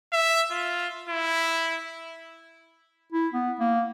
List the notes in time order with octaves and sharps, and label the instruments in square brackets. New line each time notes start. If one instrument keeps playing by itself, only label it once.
[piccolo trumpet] E5
F4
E4
[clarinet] E4
B3
A#3